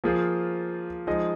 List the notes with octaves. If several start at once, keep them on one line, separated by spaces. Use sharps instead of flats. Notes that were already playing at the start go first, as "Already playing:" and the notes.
F3 A#3 F4 G#4 C5
F3 G#3 D#4 G#4 D#5